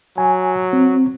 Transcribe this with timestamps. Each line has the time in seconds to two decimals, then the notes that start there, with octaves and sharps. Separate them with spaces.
0.18 F#3 G#5
0.73 C4